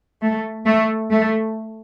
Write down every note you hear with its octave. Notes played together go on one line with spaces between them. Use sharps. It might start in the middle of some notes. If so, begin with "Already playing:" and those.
A3
A3
A3